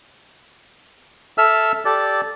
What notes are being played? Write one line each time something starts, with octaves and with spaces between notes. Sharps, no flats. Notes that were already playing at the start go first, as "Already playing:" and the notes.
A4 E5 E6 F6
G4 A4 D5